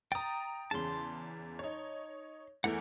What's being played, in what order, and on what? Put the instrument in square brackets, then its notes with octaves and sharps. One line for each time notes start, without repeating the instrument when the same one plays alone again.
[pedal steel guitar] G5 D#6 [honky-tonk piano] A#5 A6
[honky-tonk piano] E2 C#3 [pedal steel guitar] A5 C6
[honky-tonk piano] D#4 C#5
[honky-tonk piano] E2 E3 A3 [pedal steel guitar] A#4 F#5